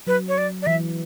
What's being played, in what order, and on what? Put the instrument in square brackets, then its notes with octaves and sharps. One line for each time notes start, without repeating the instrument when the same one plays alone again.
[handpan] F#3 [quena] B4
[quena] C#5
D5
D5
[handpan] E3 [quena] E5